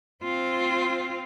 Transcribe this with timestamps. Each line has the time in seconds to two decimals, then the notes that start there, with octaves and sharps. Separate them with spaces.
0.24 C4 F4